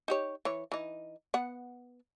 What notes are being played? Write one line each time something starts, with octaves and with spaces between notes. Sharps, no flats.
D#4 G4 C#5
E3 C#5
E3 D#4
B3 F#5